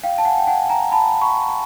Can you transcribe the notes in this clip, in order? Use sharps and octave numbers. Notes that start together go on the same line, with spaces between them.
F5 G5
A5
F#5 G#5
G5
F#5 G#5
G#5 A#5
A5 B5
B5 C#6